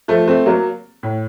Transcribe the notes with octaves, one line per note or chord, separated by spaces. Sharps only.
F3 A3
A3 C4
F#3 A#3
A2